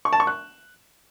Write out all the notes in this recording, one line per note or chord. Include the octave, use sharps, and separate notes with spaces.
C#6
A5
C#6
F#6